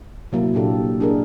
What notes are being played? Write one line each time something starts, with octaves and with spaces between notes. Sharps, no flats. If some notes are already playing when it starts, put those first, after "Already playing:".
C3 F#3 A#3 E4
A#2 D4 G4 A4
D4 G#4 A#4